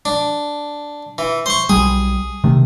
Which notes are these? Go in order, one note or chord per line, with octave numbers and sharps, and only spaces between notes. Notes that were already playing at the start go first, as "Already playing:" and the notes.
D4
E3
C5 C#6
B1 G3 G#4
C3 D#3 A3